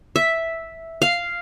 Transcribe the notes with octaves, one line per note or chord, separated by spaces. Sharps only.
E5
F5